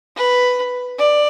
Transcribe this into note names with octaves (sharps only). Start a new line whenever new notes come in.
B4
D5